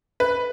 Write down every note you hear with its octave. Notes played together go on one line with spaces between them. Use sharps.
B4